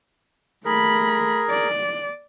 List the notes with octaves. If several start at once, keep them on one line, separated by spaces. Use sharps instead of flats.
A3 G#4 A#4 B5
D5